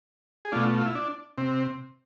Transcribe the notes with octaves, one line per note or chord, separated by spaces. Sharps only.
G#4
B2 A3 D4 F4
F4
E4
D4
C3 C4